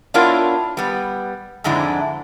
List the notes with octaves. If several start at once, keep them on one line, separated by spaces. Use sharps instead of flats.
B3 D4 E4 F4 A#4 C#5
G3 B3
F2 G#2 D3 G#3 D4 E4